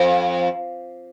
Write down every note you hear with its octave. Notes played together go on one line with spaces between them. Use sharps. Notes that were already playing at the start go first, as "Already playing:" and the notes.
Already playing: F2